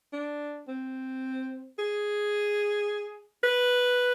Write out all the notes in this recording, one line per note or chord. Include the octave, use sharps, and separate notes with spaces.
D4
C4
G#4
B4